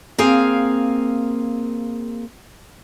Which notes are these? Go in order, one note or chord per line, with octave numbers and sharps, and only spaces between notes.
A#3 C4 G#4 F5